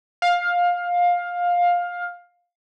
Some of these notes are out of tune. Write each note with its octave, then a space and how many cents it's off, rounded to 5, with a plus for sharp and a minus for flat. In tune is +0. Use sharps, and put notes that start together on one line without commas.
F5 +15